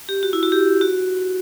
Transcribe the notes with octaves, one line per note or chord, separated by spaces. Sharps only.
G4
F#4
E4
F#4
G4
F#4